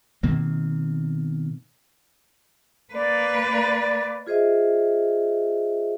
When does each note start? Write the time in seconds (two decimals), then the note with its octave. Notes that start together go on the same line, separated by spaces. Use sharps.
0.23 B2 D#3 A#3 C4
2.94 A#3 B4 D5
4.27 F4 G#4 C5 D#5 E5